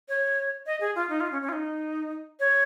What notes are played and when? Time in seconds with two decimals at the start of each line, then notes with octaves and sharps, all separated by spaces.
0.09 C#5
0.66 D#5
0.81 G#4
0.95 F4
1.09 D#4
1.20 F4
1.32 C#4
1.42 C#4
1.49 F4
1.53 D#4
2.40 C#5